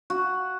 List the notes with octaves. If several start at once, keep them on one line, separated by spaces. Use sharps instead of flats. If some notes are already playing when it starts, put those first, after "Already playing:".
F#4